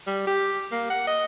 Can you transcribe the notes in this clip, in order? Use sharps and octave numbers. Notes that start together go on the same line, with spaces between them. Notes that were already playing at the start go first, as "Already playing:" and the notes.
G3
G4
A#3
F#5
D#5